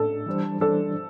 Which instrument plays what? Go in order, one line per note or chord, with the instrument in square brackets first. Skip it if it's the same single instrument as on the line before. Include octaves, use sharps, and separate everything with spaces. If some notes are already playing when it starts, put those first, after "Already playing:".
Already playing: [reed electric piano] A2 D4 [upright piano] A4
[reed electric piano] E3 G3 D4 C5
[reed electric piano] E3 G3 D4 C5 [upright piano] A4